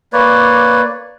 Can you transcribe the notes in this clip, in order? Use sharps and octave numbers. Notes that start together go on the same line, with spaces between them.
A#3 B4 C#5 D5